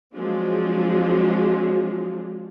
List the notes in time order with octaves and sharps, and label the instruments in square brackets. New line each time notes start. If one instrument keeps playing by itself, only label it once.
[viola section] F3 F#3 G#3 C4 D4 F4